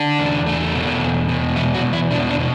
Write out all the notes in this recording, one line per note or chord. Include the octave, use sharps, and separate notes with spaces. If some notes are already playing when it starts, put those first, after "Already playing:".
Already playing: D3 D4
E2
A3
B2
E2
B2
E2 E3 E4
F#3 F#4
E2
E3 E4
B2 D3 D4
D3 D4
B2